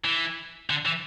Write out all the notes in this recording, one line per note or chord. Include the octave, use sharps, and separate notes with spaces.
E3
D3
E3